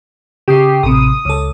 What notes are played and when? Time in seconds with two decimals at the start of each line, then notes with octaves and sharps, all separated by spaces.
0.48 C#3 G4 D#6 C7
0.83 A1 C3 D#6
1.25 C#2 A4